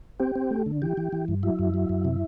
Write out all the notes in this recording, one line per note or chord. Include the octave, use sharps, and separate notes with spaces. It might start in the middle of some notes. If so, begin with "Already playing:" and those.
C4 G4
C4
A3
D3
E3 G4
E3
E3
G2
F#3 E4
F#2
F#3
F#2
C3